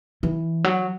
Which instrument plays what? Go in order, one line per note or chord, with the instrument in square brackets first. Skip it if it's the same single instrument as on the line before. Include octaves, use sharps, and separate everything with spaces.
[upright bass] E3
F#3